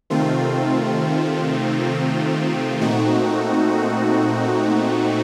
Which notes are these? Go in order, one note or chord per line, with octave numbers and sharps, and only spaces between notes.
C3 D#3 A3 C4 F4
A#2 A3 C4 D#4 F#4